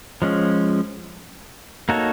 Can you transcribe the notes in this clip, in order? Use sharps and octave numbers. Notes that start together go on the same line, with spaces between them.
F3 G#3 C#4
A#3 D#4 F#4 A4 C#5